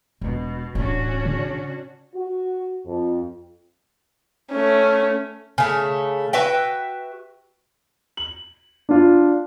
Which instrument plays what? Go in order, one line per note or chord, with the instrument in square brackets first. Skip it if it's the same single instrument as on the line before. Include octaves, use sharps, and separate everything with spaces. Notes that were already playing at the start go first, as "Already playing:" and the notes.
[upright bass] E1 [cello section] B2
[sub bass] D1 [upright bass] A1 [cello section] C#4 D4 F#4
[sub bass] C#3
[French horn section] F#4
F2
[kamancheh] A3 C#4
[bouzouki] C#3 A3
F#4 B4 E5 G5
[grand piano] F#7
D4 F4